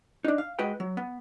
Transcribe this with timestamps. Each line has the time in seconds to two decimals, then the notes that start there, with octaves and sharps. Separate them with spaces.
0.24 D4 D#4
0.38 F5
0.59 G#3 F#4 B4 D#5 G5
0.80 F#3
0.97 B3